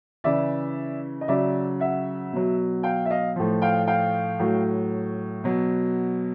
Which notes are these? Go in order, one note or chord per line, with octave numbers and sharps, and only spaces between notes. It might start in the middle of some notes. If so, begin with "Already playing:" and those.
C#3 E3 D5 E5
D#5
C#3 F#3 D5 E5
E5 F#5
B2 F#3
F5 G5
E5
D#5 F5
A2 F3
F5 G5
F5 G5
A2 F#3
B2 F#3